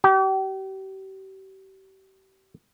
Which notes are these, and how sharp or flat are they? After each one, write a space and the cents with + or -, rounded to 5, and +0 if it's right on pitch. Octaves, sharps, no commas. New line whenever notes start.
G4 -40